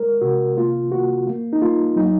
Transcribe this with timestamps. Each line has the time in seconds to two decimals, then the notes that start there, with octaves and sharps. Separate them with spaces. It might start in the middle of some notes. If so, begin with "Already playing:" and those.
Already playing: G#3 A#4
0.21 C3 F#4
0.57 A#3 F4
0.91 A#3 F#4
1.27 A#3
1.53 D#4
1.61 A#3 F4
1.96 F#3 D#4